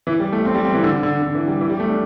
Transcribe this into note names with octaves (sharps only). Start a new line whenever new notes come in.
E3
G3
A3
C4
G3
C4
E3
D3
D3
D3
E3
G3
E3
G3
A3
D4